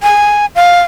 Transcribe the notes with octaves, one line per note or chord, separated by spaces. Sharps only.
G#5
F5